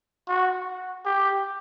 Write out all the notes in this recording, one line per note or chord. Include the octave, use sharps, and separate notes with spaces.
F#4
G4